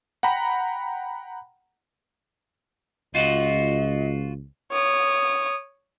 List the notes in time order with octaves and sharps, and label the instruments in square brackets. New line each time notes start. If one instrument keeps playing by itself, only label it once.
[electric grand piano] F#5 G5 A#5 B5
[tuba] C#2 [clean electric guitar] F4 F#4 [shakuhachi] D#5
[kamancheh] C#5 D#6